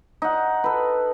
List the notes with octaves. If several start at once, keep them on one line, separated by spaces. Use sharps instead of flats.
D#4 F#5
A4 B4